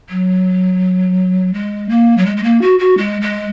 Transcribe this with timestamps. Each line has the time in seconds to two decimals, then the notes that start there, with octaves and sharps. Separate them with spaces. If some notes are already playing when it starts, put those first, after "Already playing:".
0.10 F#3
1.54 G#3
1.89 A#3
2.18 F#3
2.26 G#3
2.37 G#3
2.43 A#3
2.62 F#4
2.79 F#4
2.98 G#3
3.22 G#3